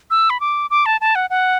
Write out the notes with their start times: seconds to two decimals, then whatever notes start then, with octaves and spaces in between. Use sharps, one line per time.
0.10 E6
0.30 B5
0.40 D6
0.70 D6
0.86 A5
1.01 A5
1.15 F#5
1.30 F#5